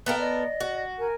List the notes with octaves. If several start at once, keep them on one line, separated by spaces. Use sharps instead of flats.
B3 A4 A#4 D#5 F5 G5
D5 D#5
F#4
A#4 G#5